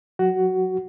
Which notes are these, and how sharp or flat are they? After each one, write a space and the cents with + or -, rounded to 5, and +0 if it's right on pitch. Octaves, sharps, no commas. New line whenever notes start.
F#3 -15 F#4 +10